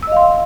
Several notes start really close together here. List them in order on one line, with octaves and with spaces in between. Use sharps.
E6 D#5 F5 C6